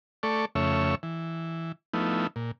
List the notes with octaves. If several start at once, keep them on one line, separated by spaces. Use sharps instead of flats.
A3 A4 D5 C#6
F2 C#3 A3 C#5 E5
E3
F3 A3 B3 D#4 E4
A#2